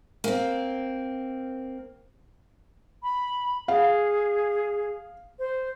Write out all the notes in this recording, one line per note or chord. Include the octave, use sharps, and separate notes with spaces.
A#3 C4
B5
G#4 F5
C5